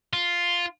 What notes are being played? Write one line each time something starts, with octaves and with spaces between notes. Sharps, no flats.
F4